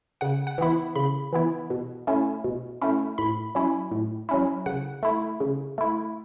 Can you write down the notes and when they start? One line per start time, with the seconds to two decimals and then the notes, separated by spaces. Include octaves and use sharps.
0.21 C#3 F#5
0.47 F#5
0.58 E3 B3 E4
0.96 C#3 B5
1.33 E3 B3 E4
1.70 B2
2.07 A3 C#4 E4
2.44 B2
2.82 A3 C#4 E4
3.18 A2 B5
3.55 F#3 C#4 E4
3.91 A2
4.29 F#3 C#4 E4
4.66 C#3 F#5
5.03 A3 E4
5.40 C#3
5.78 A3 E4